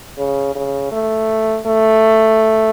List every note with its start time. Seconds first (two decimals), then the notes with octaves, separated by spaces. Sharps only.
0.18 C#3
0.55 C#3
0.92 A3
1.66 A3